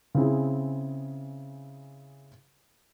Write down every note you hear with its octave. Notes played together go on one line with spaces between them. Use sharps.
C#3 C4 E4 G#4